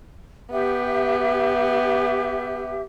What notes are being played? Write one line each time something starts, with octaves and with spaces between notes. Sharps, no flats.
B3 G4 E5